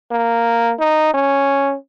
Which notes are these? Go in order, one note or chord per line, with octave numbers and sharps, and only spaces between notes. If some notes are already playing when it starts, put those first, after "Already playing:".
A#3
D#4
C#4